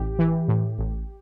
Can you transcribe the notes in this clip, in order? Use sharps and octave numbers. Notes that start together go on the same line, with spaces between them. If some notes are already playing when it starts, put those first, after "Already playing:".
Already playing: A1 G4
E3
A2
A1